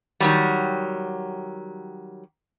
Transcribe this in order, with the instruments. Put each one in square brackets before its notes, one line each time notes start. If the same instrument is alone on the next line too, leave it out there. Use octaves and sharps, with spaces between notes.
[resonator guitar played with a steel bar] D#3 F#3 G3